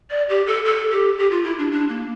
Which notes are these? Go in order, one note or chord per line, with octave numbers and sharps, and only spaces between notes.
D5
G4
A4
A4
G4
G4
F4
E4
D4
D4
A#3